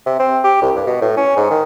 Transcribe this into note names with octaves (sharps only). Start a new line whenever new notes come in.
C3
C4
G4
C2
G2
B2
A2
C#4
G#2
D#3